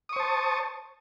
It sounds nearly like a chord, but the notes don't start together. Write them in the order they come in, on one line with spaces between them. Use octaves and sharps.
D#6 C#6 C5 A5